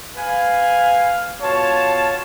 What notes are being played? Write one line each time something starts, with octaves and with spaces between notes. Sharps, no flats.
B4 F5 G#5
B2 F4 C#5 A5